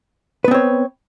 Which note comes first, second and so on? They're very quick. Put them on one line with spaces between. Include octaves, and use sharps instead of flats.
B4 B3 C4 C#5